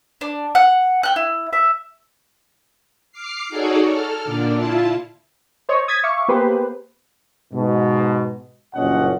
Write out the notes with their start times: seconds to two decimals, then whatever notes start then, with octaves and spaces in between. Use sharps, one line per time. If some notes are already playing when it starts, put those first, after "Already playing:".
0.21 D4
0.55 F#5
1.03 G5 F#6
1.16 E4
1.53 E5
3.12 D6 F6 C7
3.49 D#4 F#4 G#4 A4 C#5 D5
3.88 A4 F6
4.25 A#2 D3 D4
4.56 E4 F4 A5
5.69 C5 C#5 D#5
5.88 D#6 G#6 A6 B6
6.03 E5 F5 C#6 D6
6.28 A#3 B3 G4 G#4 B4 C5
7.53 G#2 B2
8.75 F#1 G2 A#2 C#4 D#5 F#5